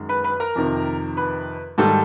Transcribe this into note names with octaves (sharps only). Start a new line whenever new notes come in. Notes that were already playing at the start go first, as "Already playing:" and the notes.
Already playing: F#2 D#3 G#3
B4 B5
B4 B5
A#4 A#5
F2 C3 D#3
B4 B5
G#2 D#3 G3 A4 A5